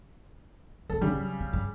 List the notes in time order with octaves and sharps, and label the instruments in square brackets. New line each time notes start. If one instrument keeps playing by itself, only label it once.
[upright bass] D1 [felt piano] A4
[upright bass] G2 [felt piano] C#3 G3
[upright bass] F#3
C4
G2